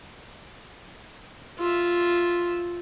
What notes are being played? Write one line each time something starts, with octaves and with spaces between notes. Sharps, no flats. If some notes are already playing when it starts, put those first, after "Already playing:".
F4 E5